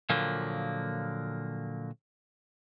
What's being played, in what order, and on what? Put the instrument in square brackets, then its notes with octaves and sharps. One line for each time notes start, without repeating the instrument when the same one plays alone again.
[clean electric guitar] A#2 D3 F3 F#3 A#3